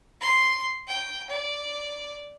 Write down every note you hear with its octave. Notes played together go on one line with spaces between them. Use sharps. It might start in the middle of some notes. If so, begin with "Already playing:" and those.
C6
G5
D5